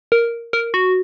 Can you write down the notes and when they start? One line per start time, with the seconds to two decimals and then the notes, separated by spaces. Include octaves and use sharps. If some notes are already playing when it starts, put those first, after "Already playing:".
0.12 A#4
0.53 A#4
0.74 F#4